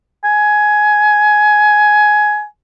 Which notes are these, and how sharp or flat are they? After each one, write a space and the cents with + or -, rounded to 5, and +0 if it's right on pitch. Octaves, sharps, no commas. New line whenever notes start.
G#5 +15